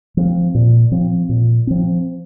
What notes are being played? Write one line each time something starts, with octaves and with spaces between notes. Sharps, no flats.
F3 C4
A#2
F3 C4
A#2
F3 C4